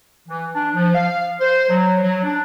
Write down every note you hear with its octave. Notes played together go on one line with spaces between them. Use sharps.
E3
D4
F3
F5
C5
F#3
F#3
D4